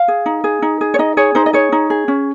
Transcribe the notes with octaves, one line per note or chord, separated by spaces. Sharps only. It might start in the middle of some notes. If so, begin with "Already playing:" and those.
Already playing: F5
G#4
D#4
G#4
D#4
G#4
C#5
D#4 D#5
G#4 C#5
D#4 C5
D#5
G#4 C#5
D#4
G#4
C#4